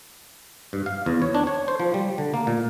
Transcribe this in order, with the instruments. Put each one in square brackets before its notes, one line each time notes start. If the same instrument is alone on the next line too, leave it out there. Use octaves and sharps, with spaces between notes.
[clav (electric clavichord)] G2
F5
E2
C#5
D4
C#5
C5
F3
G3
D3
A#3
A#2